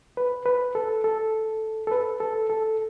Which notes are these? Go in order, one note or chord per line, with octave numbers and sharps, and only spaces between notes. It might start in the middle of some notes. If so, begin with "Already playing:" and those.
B4
B4
A4
A4
A4
B4
A4
A4